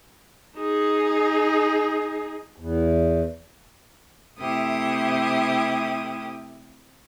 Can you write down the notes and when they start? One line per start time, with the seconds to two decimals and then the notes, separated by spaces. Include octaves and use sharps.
0.57 D#4 G#4
2.56 E2
4.39 C3 A3 E4 G4 D#6